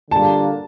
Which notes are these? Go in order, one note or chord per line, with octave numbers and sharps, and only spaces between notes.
D3 G3 A#3 D4 F4 A5